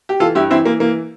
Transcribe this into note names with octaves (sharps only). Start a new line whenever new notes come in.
G4
E3 F4 A4
G2 E4 G4
E3 C4 E4
E3 A#3
E3 A#3